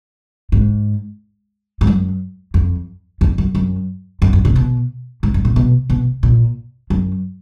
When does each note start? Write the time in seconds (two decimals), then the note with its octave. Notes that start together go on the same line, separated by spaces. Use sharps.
0.52 G#2
1.81 G#2
1.87 F#2
2.54 F2
3.21 F2
3.38 F#2
3.55 F#2
4.22 F#2
4.33 F#2
4.45 A#2
4.56 B2
5.23 G#2
5.34 F#2
5.45 A#2
5.56 B2
5.90 B2
6.23 A#2
6.90 F#2